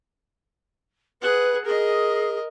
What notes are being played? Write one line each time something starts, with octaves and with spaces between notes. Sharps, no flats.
G#4 B4 F#5
G#4 A#4 D#5